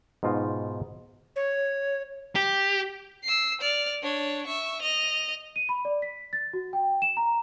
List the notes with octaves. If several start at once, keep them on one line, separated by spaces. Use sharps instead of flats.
G#2 B2 D#4 F4
C#5
G4
E6 C7
D5 F6
D4 C#5
E5 C#6
D#5 F7
D#7
B5
D5
B6
A6
F#4
G5
E7
A#5